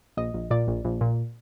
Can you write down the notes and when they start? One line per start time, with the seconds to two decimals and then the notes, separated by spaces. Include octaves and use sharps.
0.17 A#1 D#5
0.34 A#1
0.51 A#2 D5
0.67 A#1
0.85 A#1
1.01 A#2